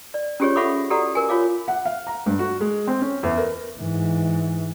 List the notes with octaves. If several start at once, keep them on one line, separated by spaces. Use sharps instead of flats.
D5
C#4 F4 G4 G#4 C5 C#5
A4 E5 F#5 B5 C#6 D6
F#4 G4 A4 D5 F#5 A#5
A#4 G#5
F4 C#5 F5 D6
F#5
F5
A#5
G2
F#4
G#3
C4
C#4
E2
A#4
G#2 E3